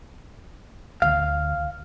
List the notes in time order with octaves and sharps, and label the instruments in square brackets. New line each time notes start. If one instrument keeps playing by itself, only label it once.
[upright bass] D2 [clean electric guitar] F5